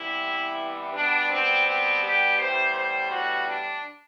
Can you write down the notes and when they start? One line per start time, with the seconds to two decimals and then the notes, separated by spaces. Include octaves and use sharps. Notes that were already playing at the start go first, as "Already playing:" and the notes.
Already playing: C3 E3 G3 B3 E4
0.94 B2 G3 B3 D4
1.30 C4
1.66 C4
2.02 G4
2.38 A2 E3 G3 B3 C5
2.75 C5
3.11 F#4
3.47 D4